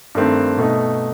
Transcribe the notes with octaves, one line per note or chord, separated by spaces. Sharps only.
G2 D#3 A3 C4
B2 A3 D#4